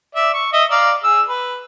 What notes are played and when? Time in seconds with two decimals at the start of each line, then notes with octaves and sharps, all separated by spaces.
0.15 D5 E5
0.34 C#6
0.53 D#5 E5
0.71 D5 F5 A#5
1.04 G#4 E6
1.28 B4